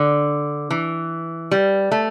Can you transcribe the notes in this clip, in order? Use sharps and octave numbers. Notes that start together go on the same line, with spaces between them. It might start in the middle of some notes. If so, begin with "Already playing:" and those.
Already playing: D3
E3
G3
A3